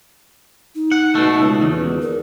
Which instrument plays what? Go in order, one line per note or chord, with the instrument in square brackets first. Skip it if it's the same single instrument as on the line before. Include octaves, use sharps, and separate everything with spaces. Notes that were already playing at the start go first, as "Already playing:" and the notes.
[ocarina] D#4
[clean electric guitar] F#5
B2 A3
C#2
E2
[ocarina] A#4